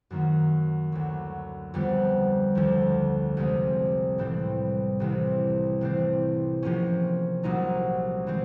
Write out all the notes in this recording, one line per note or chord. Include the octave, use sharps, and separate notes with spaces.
F#2 D#3 F#3 A#3
D2 D3 F#3
F2 D3 G3 B3
D2 D3 F3
C2 C3 F3 G#3
A2 E3 G3 C4
C2 C3 E3
C3 E3 A3 C4
C3 F3 A#3 C#4
C2 A#2 F#3 A#3 D#4
E3 G#3 C4